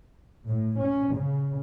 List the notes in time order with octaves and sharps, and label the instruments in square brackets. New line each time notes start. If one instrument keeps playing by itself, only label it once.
[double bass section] A2
C#4
C#3